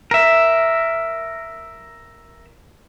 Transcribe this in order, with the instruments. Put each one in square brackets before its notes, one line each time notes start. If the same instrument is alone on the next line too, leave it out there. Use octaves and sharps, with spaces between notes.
[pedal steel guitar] A#4 E5